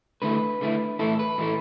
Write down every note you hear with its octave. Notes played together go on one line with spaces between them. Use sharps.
D3 A3 E4 B4
D3 A3 E4
A2 E3 A3 E4 A4
B4
A2 E3 A3 E4